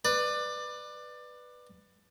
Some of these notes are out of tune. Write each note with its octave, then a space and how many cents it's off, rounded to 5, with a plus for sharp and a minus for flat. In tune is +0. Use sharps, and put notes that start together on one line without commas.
B4 +0 D5 +20